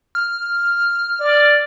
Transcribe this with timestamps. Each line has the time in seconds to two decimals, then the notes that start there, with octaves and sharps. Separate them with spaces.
0.15 F6
1.20 D5